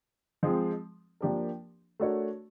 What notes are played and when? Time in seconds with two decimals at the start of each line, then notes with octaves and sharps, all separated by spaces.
0.43 F3 G#3 C4
1.21 F3 A#3 D4 G4 A#4
2.00 A3 D4 F#4 A#4 C#5